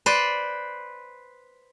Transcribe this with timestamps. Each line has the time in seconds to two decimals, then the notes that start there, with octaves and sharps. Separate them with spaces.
0.06 B4 C5 D5